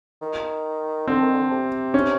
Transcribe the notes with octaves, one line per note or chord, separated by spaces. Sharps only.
D#3
D3 C4
D#3
D3
C3
C#4